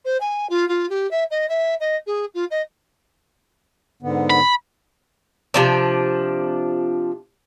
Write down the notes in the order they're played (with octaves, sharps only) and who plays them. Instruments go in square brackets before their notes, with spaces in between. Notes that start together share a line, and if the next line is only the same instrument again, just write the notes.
[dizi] C5
G#5
F4
F4
G4
E5
D#5
E5
D#5
G#4
F4
D#5
[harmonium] G#2 D3 B3
[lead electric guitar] B5
[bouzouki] C3 F3 D4